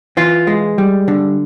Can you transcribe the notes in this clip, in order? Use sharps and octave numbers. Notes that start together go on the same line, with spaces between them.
E3 F4
G#3
G3
D3